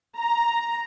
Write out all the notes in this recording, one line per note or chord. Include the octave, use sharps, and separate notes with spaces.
A#5